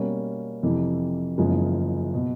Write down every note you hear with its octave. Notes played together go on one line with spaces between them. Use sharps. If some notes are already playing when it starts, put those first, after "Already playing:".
Already playing: B2 G3 A#3 C#4
F2 C3 E3
F#1 E2 C#3 F3 G#3
B2